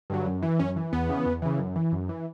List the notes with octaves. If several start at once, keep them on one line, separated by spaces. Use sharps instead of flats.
G2 D3 F#3
F#2
E3
F#2 C#4
E3
E2 B3
C#3 E3
E2
C#3 E3
F#2
E3
F#2
E3